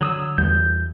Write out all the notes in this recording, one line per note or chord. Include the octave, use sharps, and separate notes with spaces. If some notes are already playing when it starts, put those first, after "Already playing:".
D3 F#3 D#6 E6
E2 E3 G3 G6